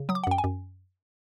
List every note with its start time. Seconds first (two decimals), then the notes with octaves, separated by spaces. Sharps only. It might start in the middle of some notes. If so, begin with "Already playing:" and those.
Already playing: C#3
0.09 F#3 D#6
0.15 D6
0.24 F#5
0.27 F#2 G5
0.38 G#5
0.44 F#2